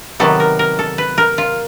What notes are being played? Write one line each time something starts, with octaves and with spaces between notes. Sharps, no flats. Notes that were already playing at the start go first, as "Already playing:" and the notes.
C3 D#3 F#3 B3 A4
A#4
A#4
A4
B4
A#4
F4